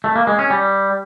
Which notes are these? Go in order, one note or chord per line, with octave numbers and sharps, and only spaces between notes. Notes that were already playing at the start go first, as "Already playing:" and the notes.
A3
A#3
G#3
C#4
G3